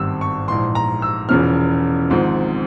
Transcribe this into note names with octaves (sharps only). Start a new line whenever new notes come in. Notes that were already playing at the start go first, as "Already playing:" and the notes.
Already playing: G#1 G2 G3 C4 E6
C#6
A#1 G#2 E3 C6
A#5
E6
E1 E2 C#3 F3 F6
G#1 G#2 F3 C4